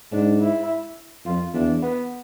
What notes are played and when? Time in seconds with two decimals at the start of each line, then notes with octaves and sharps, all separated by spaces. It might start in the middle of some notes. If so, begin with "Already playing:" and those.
0.12 G#2 D4
0.41 E4
1.25 F2 F4
1.54 E2 D4
1.82 B3